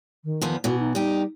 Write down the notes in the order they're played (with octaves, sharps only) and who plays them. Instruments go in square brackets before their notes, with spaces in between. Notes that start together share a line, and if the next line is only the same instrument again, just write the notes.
[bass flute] D#3
[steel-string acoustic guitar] E2 F3 B3
[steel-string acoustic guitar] B2 E3 [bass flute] F#4
[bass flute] D#4
[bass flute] G3 [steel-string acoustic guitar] D#4 G4